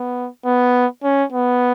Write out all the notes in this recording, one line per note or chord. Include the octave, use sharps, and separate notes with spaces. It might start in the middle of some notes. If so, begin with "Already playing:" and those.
Already playing: B3
B3
C#4
B3